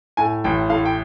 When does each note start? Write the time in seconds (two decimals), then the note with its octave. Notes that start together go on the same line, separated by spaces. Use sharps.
0.17 A2 G#5
0.44 A1 G5
0.69 A2 F5
0.85 G5